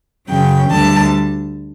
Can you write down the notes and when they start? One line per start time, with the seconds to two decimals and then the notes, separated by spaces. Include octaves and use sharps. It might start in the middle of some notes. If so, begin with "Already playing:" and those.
0.28 F#2 C#3 F#3 G5
0.70 D2 D3 G3 A5